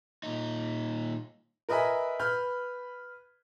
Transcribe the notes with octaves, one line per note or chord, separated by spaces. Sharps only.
A#2 D#4
A#4 B4 D#5 E5 G#5 B5
B4 B5 F6 G6